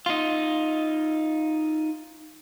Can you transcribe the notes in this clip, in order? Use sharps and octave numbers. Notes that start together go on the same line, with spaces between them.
D#4 F4